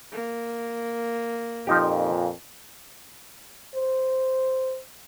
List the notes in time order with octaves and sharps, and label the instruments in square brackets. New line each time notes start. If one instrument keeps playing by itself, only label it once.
[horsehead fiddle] A#3
[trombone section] F2 A#2 [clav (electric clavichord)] F3 D#4 G4
[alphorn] C5